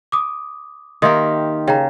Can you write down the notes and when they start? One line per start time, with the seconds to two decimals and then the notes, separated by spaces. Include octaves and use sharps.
0.12 D6 D#6
1.02 D#3 A#3 G4 E5 C6 D#6
1.68 C#3 G5 A#5